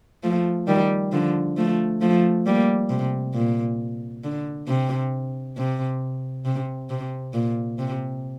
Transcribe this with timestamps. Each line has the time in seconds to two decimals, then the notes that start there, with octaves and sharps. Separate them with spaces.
0.23 F3 A3
0.67 D#3 G3
1.12 D3 F3
1.57 F3 A3
2.01 F3 A3
2.46 G3 A#3
2.90 C3
3.34 A#2
4.24 D3
4.68 C3
5.57 C3
6.45 C3
6.90 C3
7.34 A#2
7.79 C3